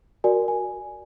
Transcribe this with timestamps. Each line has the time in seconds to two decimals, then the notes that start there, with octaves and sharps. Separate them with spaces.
0.24 F#4 A#4 D5 G#5
0.48 G#5